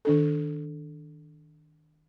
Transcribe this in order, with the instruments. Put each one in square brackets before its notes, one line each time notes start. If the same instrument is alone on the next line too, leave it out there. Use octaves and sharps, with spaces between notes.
[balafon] D#3 D4 A4